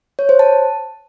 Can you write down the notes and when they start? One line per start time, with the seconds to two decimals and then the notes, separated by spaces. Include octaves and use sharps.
0.19 C#5
0.29 C5
0.39 A5